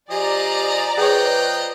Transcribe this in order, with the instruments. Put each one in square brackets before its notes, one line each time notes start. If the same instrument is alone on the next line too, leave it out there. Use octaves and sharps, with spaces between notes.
[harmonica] F3 G#4 D#5 [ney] G4 [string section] D5 A#5
[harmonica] F3 D#5 G5 [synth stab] G#4 C#5 [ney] B4